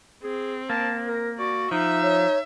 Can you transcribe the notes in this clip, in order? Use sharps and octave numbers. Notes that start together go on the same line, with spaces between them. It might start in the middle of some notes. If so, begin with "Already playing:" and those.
C4 G#4
A#3 A5
A#4
F#4 D5
F3 D#4 E5
C#5